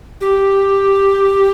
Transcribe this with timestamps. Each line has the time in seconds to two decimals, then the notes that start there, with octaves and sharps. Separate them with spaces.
0.21 G4